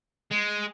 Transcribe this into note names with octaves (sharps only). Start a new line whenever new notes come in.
G#3